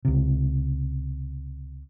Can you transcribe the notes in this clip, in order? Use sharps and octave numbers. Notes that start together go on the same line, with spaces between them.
C#2 C3